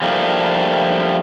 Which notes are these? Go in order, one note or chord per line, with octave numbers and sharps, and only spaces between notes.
F3 G3 A3 A#3 D4